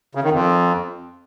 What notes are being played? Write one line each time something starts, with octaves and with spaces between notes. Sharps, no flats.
C#3
D#3
F2